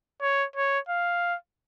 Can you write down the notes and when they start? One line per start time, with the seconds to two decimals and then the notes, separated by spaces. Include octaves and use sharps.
0.22 C#5
0.56 C#5
0.89 F5